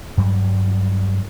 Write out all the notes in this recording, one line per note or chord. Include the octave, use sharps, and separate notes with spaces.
G2 F#3 G3